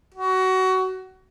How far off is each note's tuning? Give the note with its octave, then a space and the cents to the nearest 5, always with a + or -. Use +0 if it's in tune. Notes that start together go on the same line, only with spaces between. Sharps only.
F#4 +20